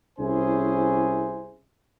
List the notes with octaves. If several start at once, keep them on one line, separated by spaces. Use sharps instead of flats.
C2 C#4 E4 G#4 C5 G#5